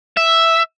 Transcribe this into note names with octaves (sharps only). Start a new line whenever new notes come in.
E5